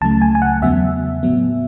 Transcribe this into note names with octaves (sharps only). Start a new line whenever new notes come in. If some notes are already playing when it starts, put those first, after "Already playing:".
C#2 C#3 F#3 A3 A5
G#5
G#5
F#5
E2 C#3 F#3 B3 E5
A2 F#3 B3